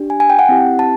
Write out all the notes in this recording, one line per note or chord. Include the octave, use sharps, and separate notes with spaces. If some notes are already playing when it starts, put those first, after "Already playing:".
Already playing: D4 G4
G#5
G#5
G5
F#5
C4 E4 G4
A5